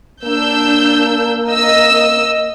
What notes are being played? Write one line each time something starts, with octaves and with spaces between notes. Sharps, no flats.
A#3 D4 E6 G6
D#5 E6